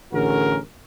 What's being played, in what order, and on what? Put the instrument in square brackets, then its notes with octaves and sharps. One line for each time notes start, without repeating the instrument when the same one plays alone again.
[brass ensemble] A1 D3 C#4 F#4 G#4 A#4